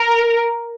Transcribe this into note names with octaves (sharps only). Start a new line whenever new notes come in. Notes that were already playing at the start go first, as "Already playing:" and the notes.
Already playing: A#4